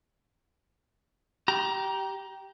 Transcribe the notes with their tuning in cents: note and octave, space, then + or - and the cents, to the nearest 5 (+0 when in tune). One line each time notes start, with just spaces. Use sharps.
G4 -15 A#5 +20